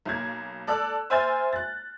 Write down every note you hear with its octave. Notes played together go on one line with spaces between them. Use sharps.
B1 A#3 G#6
A4 D5 D6 E6 F#6
C5 E5 G#5 F6 G6 A6
F#6 A6